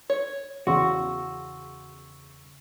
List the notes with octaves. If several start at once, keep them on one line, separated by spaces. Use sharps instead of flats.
C#5
E2 C#3 F#4 C6 C#6 E6